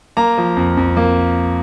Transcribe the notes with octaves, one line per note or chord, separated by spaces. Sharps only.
A#3 A#5
F3
F2
F2
A#3